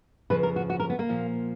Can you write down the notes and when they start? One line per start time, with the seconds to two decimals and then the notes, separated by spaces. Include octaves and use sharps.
0.30 F2 C#3 F3 B4
0.43 A#4
0.56 F#4
0.70 F#4
0.80 A#4
0.90 B3
0.99 A#3
1.09 A#2 F3